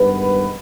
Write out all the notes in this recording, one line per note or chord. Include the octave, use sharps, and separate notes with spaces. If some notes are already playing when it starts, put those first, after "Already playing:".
Already playing: G2 D#3 G#3 B3 B4